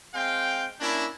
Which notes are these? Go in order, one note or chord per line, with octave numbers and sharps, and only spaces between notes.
G#3 C4 F5 G5
A#3 C#4 D4 E4